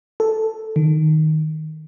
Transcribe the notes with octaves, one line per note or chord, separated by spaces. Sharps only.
A4
D#3